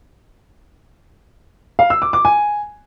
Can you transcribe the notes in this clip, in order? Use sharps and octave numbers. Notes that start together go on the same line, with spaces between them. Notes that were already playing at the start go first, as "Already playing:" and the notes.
F5
E6
D6
D6
G#5